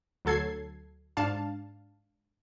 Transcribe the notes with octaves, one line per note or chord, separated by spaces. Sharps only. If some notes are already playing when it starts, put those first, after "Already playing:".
D2 F#3 A4 G#6 C7
G#2 D4 F5 A5